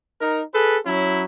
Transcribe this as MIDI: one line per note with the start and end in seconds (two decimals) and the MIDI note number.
0.19 0.40 63
0.19 0.40 70
0.53 0.77 68
0.53 0.77 69
0.53 0.77 71
0.86 1.24 54
0.86 1.24 61
0.86 1.24 64